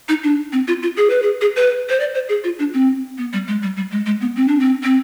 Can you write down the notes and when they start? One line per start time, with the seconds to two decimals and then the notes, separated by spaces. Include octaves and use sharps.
0.09 D#4
0.23 D4
0.53 C4
0.68 F4
0.83 F4
0.97 G#4
1.10 B4
1.22 G#4
1.41 G#4
1.56 B4
1.89 C5
2.00 D5
2.14 C5
2.29 G#4
2.44 F4
2.59 D4
2.74 C4
3.18 B3
3.33 G3
3.47 G#3
3.62 G3
3.77 G3
3.91 G#3
4.06 G#3
4.21 B3
4.36 C4
4.48 D4
4.60 C4
4.83 C4